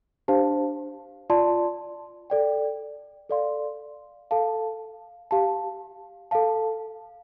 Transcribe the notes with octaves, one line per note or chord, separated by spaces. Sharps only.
D4 G4 C5 F5 A5
F4 D5 A5 C6
A4 D5 G5
A4 D5 F5 C6
A4 F5 A5
G4 F5 A5
A4 F5 A5